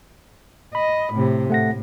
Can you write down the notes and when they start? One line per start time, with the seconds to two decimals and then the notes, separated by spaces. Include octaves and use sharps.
0.75 D#5 B5
1.13 A2 C3
1.50 A2 A3 F#5 A#6